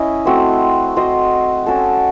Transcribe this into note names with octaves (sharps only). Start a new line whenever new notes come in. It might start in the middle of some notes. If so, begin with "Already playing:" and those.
Already playing: C#4 E4 D#5
A3 C4 F#4 C5
C4 F#4 C5 D#5
C#4 F#4 A4